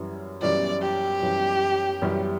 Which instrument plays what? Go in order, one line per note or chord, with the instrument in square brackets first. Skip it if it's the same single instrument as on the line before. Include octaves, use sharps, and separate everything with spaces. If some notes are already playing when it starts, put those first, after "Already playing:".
Already playing: [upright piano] F#2 E3 G3 C#4
[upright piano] F#2 E3 G3 C#4 [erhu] D5
[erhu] G4
[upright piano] F#2 E3 G3 C#4
F#2 E3 G3 C#4